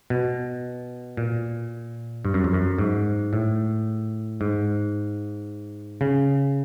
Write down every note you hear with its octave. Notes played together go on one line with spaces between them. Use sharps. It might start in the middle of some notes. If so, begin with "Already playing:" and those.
B2
A#2
G2
F#2
F2
F#2
G#2
A2
G#2
C#3